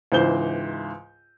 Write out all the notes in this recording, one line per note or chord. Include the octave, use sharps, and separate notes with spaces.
C#2 G#2 E3 C5 G6 G7